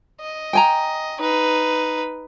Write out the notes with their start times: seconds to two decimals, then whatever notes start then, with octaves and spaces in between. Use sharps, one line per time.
0.21 D#5
0.53 G5 G#5 A#5
1.19 D#4 B4